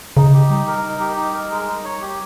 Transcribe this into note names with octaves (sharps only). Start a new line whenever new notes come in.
C#3 D#4
G4
G3 D#4
A#4
D#4
G4
D#4
A#4
G#3
D#4
C#5
G4